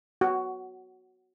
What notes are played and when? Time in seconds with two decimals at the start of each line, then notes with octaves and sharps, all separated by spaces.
0.21 F#4